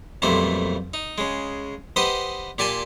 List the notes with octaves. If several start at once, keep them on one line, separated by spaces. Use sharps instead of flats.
B1 F2 A#2 G3 A3 C5
D#4
C#3 G#3
G4 B4 C5 D#5 F#5 C6
A#2 G4 D5 G#5 A5 C6